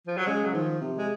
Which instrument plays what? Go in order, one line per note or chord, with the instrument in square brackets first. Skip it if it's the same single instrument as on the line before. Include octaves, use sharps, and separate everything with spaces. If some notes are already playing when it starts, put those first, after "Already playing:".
[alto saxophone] F3
F#3
[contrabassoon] C#3 [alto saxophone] G#3
[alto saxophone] F#3
[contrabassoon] D#3 [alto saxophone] F3
[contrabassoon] C3
[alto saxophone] G#3